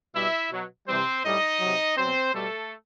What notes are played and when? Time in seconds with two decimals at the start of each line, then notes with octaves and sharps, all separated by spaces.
0.14 B2 G3 E4 E5
0.51 B2 F#3
0.87 C3 E3 G3 C4 C5
1.24 A2 G3 D#4 D#5
1.60 C3 F#3
1.97 B2 F#3 C4 C5
2.33 B2 G3 A3 A4